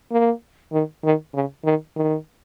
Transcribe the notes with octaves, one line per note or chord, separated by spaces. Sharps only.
A#3
D#3
D#3
C#3
D#3
D#3